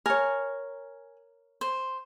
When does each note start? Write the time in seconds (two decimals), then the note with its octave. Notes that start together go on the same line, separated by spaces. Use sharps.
0.06 A#4 C#5 G#5
1.61 C5